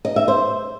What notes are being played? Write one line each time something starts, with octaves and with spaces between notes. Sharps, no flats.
D#5
E5
C5